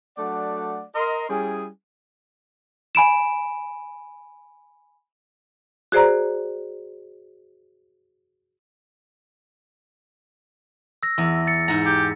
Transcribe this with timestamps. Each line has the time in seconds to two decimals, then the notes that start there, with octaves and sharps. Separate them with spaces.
0.18 F#3 A3 D4 D5 F#5
0.95 A#4 D#5 C6
1.30 G3 C#4 E4 G#4
2.95 G#5 B5 D7 E7
5.92 F#4 G#4 C5 D5 A#5
11.03 E6 A#6
11.18 E2
11.47 A6 C#7
11.68 G#2 F#5 A#5
11.86 G4